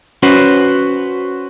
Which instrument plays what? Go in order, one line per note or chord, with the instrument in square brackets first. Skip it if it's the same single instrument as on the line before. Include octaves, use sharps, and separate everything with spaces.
[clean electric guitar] C#4 F#4 B4 C5